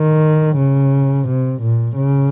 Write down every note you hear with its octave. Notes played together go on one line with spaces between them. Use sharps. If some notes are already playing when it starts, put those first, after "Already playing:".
Already playing: D#3
C#3
C3
A#2
C#3